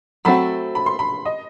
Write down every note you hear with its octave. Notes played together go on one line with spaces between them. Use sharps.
F#3 A3 C4 F#4 B5
B5
C6
B5
D#5